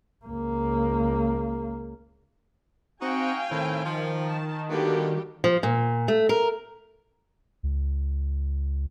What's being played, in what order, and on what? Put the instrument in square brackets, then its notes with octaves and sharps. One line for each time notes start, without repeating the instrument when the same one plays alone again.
[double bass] C#2 A#3
[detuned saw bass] C4 [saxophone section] D#4 F#4 [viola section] F5 G5 G#5
[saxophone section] A2 C4 [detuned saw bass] D#3
[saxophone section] F3
[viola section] A5
[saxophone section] D3 A#3 B3 [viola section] G3 F#4 G4
[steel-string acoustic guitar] F3
A#2
A3
A#4
[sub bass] C#2